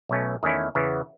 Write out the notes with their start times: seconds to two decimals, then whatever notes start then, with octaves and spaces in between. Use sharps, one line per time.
0.09 B1 B2 A3 C#4
0.43 E2 D#3 A3 C#4 E4
0.75 E2 C#3 E3 B3